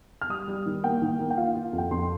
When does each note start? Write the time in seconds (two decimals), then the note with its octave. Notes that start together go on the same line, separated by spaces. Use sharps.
0.21 F6
0.29 G3 D#6
0.48 G3
0.66 D#3
0.83 A#3 G5
1.02 D#3
1.19 A#3
1.30 G5
1.37 F4 F5
1.55 F4
1.73 F2
1.78 G5
1.91 F2 C6